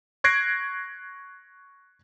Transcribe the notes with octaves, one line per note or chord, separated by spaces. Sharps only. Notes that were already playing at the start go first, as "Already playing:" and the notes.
C#6 F#6 G#6 A#6 C7 D7